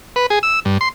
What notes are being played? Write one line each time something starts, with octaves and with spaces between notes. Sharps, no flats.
B4
G#4
E6
G2
C6